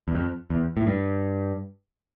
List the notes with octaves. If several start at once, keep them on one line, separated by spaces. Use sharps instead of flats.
E2
F2
E2
A2
G2